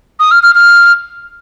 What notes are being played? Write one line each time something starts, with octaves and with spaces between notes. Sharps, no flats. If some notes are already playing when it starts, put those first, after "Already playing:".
D#6
F6
F6
F6